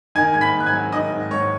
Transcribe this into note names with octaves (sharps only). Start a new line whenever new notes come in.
D#3 G#5 G#6
G#2 G#6
B5 B6
G#2
F#6
G#5 G#6
F#3
D#3 D#5 D#6
G#2
G#2 C#5 C#6